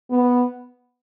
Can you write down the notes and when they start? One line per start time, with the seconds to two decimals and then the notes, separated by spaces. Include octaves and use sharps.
0.10 B3